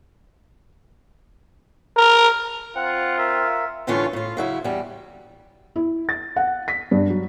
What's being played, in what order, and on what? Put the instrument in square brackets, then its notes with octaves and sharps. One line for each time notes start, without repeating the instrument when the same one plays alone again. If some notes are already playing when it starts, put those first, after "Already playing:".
[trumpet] A#4
[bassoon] C4 [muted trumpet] F4 [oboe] F#5
[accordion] A#4 F5 [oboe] E5
[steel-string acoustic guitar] A2 D3 E3 A3 C#4 F4
A2 F4
C#3 F#3 E4
E2 G3
[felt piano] E4
A6
F#5
B6
G2
F#3